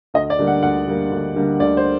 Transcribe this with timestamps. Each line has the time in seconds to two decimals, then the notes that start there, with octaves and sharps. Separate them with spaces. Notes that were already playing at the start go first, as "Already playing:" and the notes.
0.14 D2 D#5
0.30 D5
0.39 D3 G3 A#3
0.47 F#5
0.63 D2 F#5
0.87 D3 G3 A#3
1.12 D2
1.36 D3 G3 A#3
1.60 D2 D5
1.77 C5